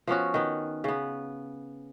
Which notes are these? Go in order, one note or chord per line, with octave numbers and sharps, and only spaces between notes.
F3 B3 C#4 F#4
D#3 B3
C#3 B3